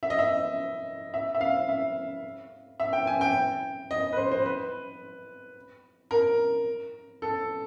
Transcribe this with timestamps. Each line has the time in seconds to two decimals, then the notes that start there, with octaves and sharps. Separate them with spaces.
0.03 E5
0.10 D#5
0.19 E5
1.14 E5
1.35 E5
1.41 F5
1.69 E5
2.80 E5
2.93 G5
3.07 G#5
3.21 G5
3.91 D#5
4.13 B4
4.17 C5
4.32 C5
4.46 B4
6.11 A#4
7.22 A4